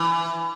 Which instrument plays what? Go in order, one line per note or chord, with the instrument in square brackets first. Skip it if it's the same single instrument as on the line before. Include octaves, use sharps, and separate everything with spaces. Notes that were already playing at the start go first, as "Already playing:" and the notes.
Already playing: [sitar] E3